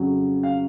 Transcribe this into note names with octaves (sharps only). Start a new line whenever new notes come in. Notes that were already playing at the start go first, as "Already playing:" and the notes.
Already playing: F2 C#3 F#3
F5